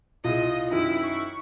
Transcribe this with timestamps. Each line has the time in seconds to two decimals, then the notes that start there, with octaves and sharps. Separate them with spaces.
0.24 C2 F4 G#4 D#5
0.71 F#2 D#3 E4
1.03 C#6